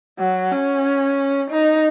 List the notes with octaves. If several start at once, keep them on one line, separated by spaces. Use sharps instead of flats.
F#3
C#4
D#4